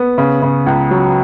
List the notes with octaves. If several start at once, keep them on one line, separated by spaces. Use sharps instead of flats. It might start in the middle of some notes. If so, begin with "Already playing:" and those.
Already playing: B3
C#3
C#3
C#2
F#3